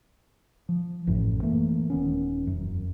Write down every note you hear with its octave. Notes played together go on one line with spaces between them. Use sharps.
F3
A1 F#2 A2
E3 A3 A#3
D#1 D#3 B3 C#4
E1 F#2